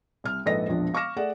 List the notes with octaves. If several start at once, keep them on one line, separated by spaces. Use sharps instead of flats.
C2 F6
A#1 G#2 A4 B4 D#5 A#6
E1 A#1 F3 D4
F5 C#6 D6 F6 A#6 E7
A3 G#4 D5 F#5